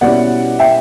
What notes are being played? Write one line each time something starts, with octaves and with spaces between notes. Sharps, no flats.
B2 G3 C#4 E4 D5 F#5
E5 G5